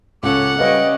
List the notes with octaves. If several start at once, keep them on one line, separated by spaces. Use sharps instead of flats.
C#2 C#4 A4 F#5 D6
G3 C#4 B4 D#5 F5